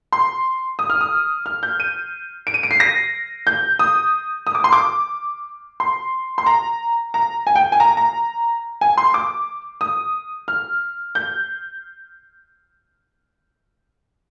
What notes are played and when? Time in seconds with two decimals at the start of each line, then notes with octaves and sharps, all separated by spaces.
0.13 C6
0.79 D#6
0.90 F6
1.01 D#6
1.46 F6
1.63 G6
1.80 D#7
2.47 D7
2.54 D#7
2.63 D7
2.71 C7
2.80 A#6
3.47 G6
3.79 D#6
4.47 D#6
4.55 D6
4.64 C6
4.73 D6
5.80 C6
6.38 C6
6.46 A#5
7.14 A#5
7.47 G#5
7.56 G5
7.72 G#5
7.80 A#5
7.97 A#5
8.81 G#5
8.98 C6
9.14 D6
9.81 D#6
10.48 F6
11.15 G6